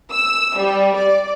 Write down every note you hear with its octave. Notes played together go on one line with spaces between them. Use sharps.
E6
G3
D5